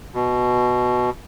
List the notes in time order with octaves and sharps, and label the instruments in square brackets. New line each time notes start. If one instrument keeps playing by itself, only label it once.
[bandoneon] B2